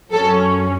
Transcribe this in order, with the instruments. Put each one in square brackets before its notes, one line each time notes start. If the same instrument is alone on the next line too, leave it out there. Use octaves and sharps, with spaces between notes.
[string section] F#2 F#3 C#4 A4